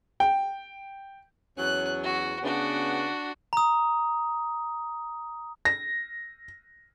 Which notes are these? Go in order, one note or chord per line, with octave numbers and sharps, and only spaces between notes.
G5
E2 F#3 C#4 F#6
F#4
C#3 B3 D4 F#4
A#5 D#6
A#6